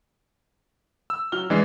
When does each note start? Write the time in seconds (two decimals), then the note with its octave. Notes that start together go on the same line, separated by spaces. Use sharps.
1.10 E6
1.32 F#3 F6 G7
1.50 E3 G#3 D4 D#5 C7